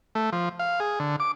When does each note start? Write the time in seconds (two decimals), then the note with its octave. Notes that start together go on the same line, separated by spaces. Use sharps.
0.15 A3
0.33 F3
0.59 F5
0.80 G#4
1.00 D3
1.20 D6